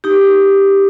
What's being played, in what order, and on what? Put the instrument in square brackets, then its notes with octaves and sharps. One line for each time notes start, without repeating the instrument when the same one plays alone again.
[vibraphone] D#4 G4